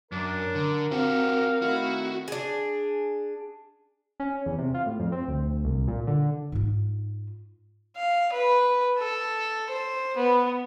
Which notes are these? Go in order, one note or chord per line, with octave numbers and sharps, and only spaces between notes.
F#2 D4 A#4
D3
C4 F#4 G4 F5
D#3 A3 E4 F#4
D4 G#4
C#4
E2
C3
F4
A2
F2
C4
D2
C2
A#2
D3
G#2 F4
F5
B4
A4
C5
B3